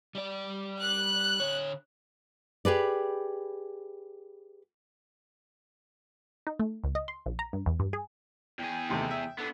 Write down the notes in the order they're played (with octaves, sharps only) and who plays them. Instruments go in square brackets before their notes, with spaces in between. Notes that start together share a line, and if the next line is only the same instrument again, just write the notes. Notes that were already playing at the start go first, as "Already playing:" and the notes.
[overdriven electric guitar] G3 D5
[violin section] F#6
[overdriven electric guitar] D3 C#5
[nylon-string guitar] G4 G#4 B4 D5
[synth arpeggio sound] D#4
A3
C#2
D#5
C6
A#1
A#5
G2
E2
G2
G#4
[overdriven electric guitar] E2 G#4 [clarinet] G5
[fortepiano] D#2 C3 A3
E5
[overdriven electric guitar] B3 D4 [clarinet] A4